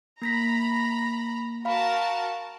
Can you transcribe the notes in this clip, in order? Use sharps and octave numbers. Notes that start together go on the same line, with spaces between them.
A#3 A#5 B5 A#6 B6
F#4 A#4 F5 A5 B5